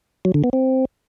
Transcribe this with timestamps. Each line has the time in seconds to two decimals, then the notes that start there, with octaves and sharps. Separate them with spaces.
0.25 F#3
0.34 D3
0.44 B3
0.53 C4